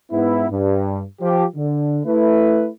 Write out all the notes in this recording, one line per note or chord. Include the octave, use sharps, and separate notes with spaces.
G#2 B3 E4
G2
F3 G4
D3
A3 E4 B4